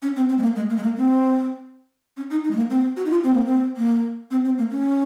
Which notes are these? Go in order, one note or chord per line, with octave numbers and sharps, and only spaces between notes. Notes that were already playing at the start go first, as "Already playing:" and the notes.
C#4
C4
C4
G#3
A#3
G#3
A#3
G#3
A#3
C4
C#4
D#4
D#4
G#3
A#3
C4
F#4
D#4
F4
C4
A#3
C4
A#3
C4
C4
A#3
C#4